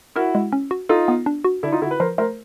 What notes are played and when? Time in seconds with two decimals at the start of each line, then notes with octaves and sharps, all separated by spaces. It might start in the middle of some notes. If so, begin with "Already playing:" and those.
0.16 E4 F#4 A#4
0.35 G#3
0.53 C#4
0.71 F#4
0.89 D#4 F4 A4
1.08 B3
1.26 D4
1.44 F#4
1.63 D3 D4 E4
1.72 D#4 F4
1.81 D3 E4 F#4
1.91 B4
2.00 F3 A#4 C5
2.18 A3 A#4 C5